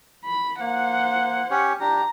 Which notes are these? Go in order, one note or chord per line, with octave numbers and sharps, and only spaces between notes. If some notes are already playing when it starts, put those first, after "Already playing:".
B5
A#3 C5 F#5
C#4 G4 C#5
D4 G4 A#5